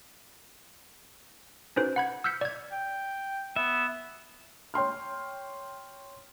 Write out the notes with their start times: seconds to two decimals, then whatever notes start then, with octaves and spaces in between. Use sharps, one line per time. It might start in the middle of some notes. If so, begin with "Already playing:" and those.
1.76 C#4 D#4 F#4 A4 B4 C5
1.96 F#5 B5 G#6
2.24 E6 F6 G6 B6 C#7
2.41 D5 G#6
2.72 G5
3.56 B3 E5
4.74 C#5 G5 C6 F6